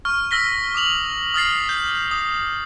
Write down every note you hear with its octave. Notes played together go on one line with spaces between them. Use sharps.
C#6 F6
E6 F6 A#6 B6 G7
D6 D#6 F7 F#7
D#6 F6 A6 C7
G6
D#6